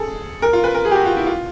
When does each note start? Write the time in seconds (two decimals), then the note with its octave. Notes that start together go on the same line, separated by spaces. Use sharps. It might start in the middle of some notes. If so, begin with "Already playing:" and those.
Already playing: G#4 A4
0.42 A#4
0.53 F4
0.64 B4
0.75 A#4
0.85 G#4
0.91 G4
0.95 F#4
1.06 F4
1.17 E4
1.27 F4